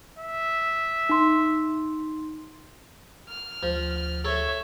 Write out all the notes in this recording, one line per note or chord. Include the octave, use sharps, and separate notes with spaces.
E5
D#4 C6
F6
D2 F3
A4 C#5 E5